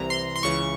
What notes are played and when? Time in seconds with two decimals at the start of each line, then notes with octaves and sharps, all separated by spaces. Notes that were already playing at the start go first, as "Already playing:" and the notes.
Already playing: C2 C3 E3 A#5
0.10 C6
0.36 C6
0.43 C#2 C#3 E3 C#6